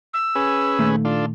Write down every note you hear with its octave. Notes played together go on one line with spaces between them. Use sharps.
E6
C#4 G#4 B4
A#2 D#3 A3
D4 F4 A4